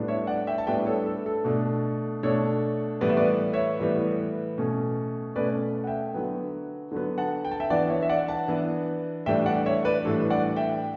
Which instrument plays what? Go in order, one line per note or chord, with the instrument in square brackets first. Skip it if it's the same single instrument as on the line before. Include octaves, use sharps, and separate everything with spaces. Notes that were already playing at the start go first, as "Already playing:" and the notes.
Already playing: [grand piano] A2 G3 B3 D4
C#5 E5
D5 F#5
E5 G5
A5
A2 G3 B3 D4 E5 G5
A4 C#5
A4
A4
B2 A3 D4
B2 A3 D4 A4 C#5
A2 E3 G3 B3 D5
E5
B4 D5
C#5 E5
A2 E3 G3 B3
B2 A3 C#4
B2 A3 C#4 B4 D5
F#5
E5 G5
D3 F#3 B3
D3 F#3 B3
F#5 A5
G5
A5
E5 G5
E3 B3 D4 D5 F#5
C#5 E5
E5
D5 F#5
F#5 A5
E3 B3 D4
A2 E3 G3 D4 E5 G5
D5 F#5
C#5 E5
B4 D5
A2 E3 G3 D4 A4
D5 F#5
E5 G5